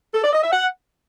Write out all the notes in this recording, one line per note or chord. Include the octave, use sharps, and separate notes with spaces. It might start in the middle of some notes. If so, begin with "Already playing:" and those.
A4
D5
D#5
E5
F#5